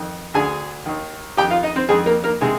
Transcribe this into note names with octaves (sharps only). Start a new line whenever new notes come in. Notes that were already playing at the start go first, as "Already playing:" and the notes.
Already playing: F2 D#3
D2 D3 G#4 G#5
D#2 D#3
F2 D#3 G4 G5
F4 F5
D#4 D#5
C4 C5
F2 D#3 G#3 G#4
A#3 A#4
A#3 A#4
C3 D#3 G#3 G#4